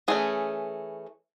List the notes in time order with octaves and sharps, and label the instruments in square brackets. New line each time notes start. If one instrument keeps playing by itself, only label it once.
[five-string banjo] E3 A3 C#4 G#4